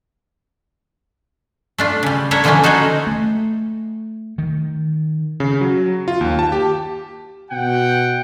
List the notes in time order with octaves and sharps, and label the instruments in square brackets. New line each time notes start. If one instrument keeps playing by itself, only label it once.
[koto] A3 D4 F4
C#3 G3
A#3 D4 A4 C#5 E5 A#5
D3 E3 F3 A3 A#3 C#4
D#4 F#4 A4 C5 C#5
[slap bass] A3
D#3
[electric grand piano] C#3
F#3
F4
D#2
A5
G4
[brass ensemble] B2 F#5 G5